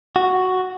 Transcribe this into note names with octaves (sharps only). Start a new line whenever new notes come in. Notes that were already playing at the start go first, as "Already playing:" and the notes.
F#4